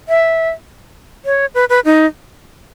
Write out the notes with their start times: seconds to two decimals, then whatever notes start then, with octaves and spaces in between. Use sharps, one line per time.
0.09 E5
1.25 C#5
1.55 B4
1.70 B4
1.85 D#4